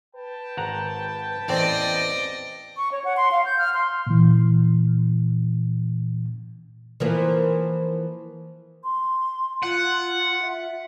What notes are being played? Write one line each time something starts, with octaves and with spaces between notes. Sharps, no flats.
B4 G5 A5
G#1 F#5 A#5
A1 E2 C4 D5 D#5
C#6
C#5
F#5
C6
F5
G6
F6
C6
A#2 E3
E3 F3 A#3
C6
F4 F#5
E5